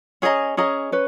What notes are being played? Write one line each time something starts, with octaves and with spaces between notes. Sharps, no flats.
C#4 G#4 D#5 A#5
C#4 G#4 D#5 A#5
C#4 B4